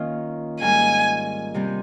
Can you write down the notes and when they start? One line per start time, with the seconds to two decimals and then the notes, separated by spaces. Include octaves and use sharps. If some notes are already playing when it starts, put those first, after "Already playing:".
Already playing: D#3 A#3 C#4 F4
0.61 G#2 D#3 G3 A#3 F4 G#5
1.54 C3 G3 C4